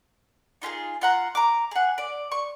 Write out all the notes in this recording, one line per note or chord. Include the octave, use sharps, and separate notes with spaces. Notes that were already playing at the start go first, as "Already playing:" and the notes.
D#4 F4 G4 G#4
F4 F#5 A#5
A#5 D6
G#4 F#5
D5
C#6